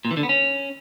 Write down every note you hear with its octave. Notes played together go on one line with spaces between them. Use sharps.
A#2
E3
D3
B3
C#4